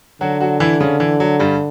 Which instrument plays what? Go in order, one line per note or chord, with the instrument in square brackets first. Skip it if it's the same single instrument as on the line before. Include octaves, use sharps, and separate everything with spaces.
[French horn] D3 [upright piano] F#3 F#4
[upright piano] F#3 F#4
E3 E4
C#3 C#4
E3
F#3
G2 G3